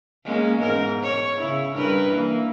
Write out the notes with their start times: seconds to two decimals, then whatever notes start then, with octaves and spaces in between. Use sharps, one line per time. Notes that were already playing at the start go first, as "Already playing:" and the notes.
0.25 G#3 A#3 C#4
0.59 E2 G#2 A#4
1.02 C#5
1.40 C#3 E4
1.74 G2 A#4 B4
2.09 E3 A#3